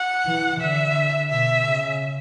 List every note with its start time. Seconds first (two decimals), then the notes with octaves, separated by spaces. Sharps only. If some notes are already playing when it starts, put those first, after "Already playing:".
Already playing: F#5
0.25 E3
0.60 D3 E5
1.30 B2 E5
1.65 C#3